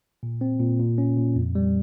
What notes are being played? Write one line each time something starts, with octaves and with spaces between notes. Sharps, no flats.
A#2
C4
A#2
A#2
C#4
A#2
F2
G3